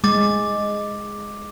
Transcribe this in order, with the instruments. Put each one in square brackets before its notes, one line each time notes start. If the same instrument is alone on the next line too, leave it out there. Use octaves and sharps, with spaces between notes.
[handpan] G#3 [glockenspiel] D6 A6